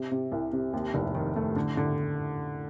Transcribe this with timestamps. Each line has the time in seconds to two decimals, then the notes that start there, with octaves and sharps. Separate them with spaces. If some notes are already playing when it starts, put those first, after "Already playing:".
Already playing: C3
0.11 C3
0.32 C2
0.53 C3
0.73 D#2
0.94 F1
1.15 D#3
1.36 A3
1.56 D3
1.77 D3